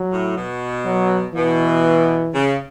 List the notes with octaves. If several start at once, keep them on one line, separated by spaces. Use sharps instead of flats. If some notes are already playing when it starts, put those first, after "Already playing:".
Already playing: F#3
A2
B2
F#3
B2 E3
C#3